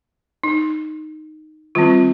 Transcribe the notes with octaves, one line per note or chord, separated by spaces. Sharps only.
D#4
D#3 G3 C4 F4